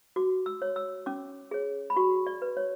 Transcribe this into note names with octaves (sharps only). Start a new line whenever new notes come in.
F#4 D6
E6
C#5
E6
C#4 D6
G#4 C#5
B5
F#4 C#6
D5
B4
C#5